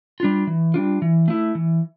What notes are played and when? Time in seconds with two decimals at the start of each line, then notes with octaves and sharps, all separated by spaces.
0.20 G3 D4 F4
0.47 E3
0.74 G3 D4 F4
1.02 E3
1.28 A3 E4
1.55 E3